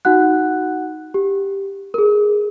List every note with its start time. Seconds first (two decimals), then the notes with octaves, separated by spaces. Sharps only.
0.05 D#4 F#4 F#5 F#6
1.14 G4
1.94 G#4 A#4